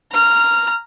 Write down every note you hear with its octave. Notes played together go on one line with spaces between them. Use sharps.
A#5 F6